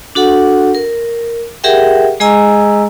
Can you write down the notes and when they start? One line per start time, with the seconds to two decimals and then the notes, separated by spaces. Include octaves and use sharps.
0.15 D4 F#4 A4 F#5
0.75 A#4
1.64 G4 G#4 A#4 E5 F#5 G5
2.20 G#3 G#4 D#5 G#5 A#5 E6